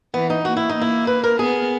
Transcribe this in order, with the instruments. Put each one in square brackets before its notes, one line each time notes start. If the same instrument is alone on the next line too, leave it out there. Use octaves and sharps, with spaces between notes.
[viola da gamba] E3 [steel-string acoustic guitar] B3
[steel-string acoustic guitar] D#4
[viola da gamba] A#3 [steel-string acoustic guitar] F#4
[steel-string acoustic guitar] E4
D#4
[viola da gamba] A#3
[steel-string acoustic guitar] E4
B4
A#4
[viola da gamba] B3 [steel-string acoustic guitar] G#4